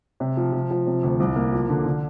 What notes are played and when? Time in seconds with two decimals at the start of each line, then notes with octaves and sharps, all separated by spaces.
0.20 C3
0.37 F3
0.53 F3
0.71 F3
0.87 C3
1.03 D2
1.20 C2
1.36 A#3
1.53 F3
1.70 D3
1.85 D3